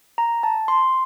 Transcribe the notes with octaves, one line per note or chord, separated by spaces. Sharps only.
A#5
A5
C6